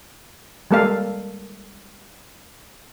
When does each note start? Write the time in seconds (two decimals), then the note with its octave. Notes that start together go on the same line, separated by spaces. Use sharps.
0.71 G3 G#3 A#3 A4 D5 F5